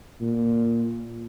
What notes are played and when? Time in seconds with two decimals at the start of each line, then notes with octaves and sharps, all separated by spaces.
0.21 A#2